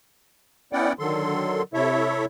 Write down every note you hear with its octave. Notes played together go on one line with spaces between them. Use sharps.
B3 C#4 E4 D5 F#5 G5
D3 D#3 F#3 A4 C6
C3 E4 A4 C#5 E5